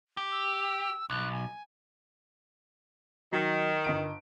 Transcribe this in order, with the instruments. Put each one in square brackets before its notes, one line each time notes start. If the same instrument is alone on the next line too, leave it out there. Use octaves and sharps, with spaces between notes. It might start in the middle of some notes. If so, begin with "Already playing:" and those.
[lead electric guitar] G4
[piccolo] E6
[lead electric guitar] B1 [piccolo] F#6
[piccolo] G#5
[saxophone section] D#3 [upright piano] F#3
[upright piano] G1 D#5 D7